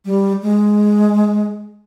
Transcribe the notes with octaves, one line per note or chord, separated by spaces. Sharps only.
G3
G#3